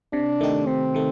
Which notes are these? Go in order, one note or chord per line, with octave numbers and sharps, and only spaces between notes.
C3 D4
D#3 A3 D#4 G4
C3 C4
D#3 A3